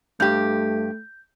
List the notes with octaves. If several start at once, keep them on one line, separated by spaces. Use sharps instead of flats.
G2 A3 G4 G6